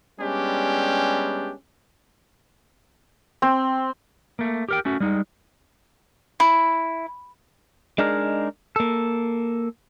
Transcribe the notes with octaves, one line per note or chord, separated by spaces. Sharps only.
G3 G#3 B3 C#4 D4 G4
C4
A3 A#3
G4 A#4 G5
A3 C#4 F#4
G3 G#3 D#4
E4
G#3 D4 D#4 G#4 A#4
A#3 A4